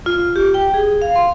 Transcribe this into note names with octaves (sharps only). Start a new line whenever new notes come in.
F4
G4
G5
G#4
F5
C6